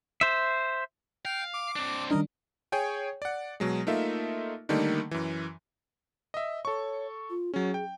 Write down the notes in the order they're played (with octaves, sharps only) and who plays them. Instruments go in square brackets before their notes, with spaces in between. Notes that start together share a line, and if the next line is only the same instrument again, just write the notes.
[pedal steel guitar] C5 E5
[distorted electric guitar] F5 [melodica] G5
[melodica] D6
[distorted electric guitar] C4 D4
[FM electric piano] D#3 G3 D4 [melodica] A#4 D#5
[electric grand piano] G#4 C#5 G5 G#5
D5 F#5
B2 F#3 G#3
A3 A#3 D#4 F4 E5
D3 D#3 G3 A3 A#3 D#4
F#2 E3
D#5 E5
[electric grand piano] A4 C#6 [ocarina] C#5
[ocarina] F4
[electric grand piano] F#3 C#4 [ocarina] G#4
[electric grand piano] G5